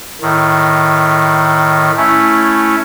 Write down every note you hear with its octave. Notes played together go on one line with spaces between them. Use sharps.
A2 D#3
A3 C#4 E4